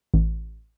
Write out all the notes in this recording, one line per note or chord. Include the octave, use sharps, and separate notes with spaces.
A1